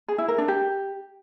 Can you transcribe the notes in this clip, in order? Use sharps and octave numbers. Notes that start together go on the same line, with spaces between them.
G#4
E4
A#4
D4
G4